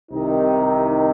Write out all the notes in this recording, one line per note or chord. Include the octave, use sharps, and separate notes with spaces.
C2 C3 D#3 D#4